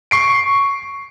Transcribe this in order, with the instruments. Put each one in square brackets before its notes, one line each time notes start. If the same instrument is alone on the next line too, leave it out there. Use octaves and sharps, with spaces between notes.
[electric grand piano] C#6 C7 D7